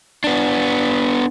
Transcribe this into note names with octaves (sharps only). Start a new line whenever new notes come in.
B3 D4